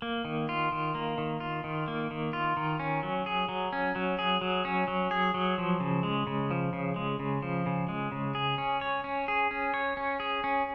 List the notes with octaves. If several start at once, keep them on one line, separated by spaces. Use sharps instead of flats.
A#3
D#3
F4
D#3
A#3
D#3
F4
D#3
A#3
D#3
F4
D#3
C#4
F#3
G#4
F#3
C#4
F#3
G#4
F#3
C#4
F#3
G#4
F#3
F3
C#3
G#3
C#3
F3
C#3
G#3
C#3
F3
C#3
G#3
C#3
G#4
C#4
C#5
C#4
G#4
C#4
C#5
C#4
G#4
C#4